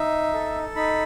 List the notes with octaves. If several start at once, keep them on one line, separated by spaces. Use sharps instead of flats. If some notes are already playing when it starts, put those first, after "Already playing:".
Already playing: D#4 E5
A4
D#4 B5